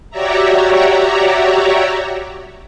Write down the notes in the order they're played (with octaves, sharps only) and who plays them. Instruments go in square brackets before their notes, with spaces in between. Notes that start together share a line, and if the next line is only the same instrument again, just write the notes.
[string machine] F#4 G4 C#5 D5 E5 A#5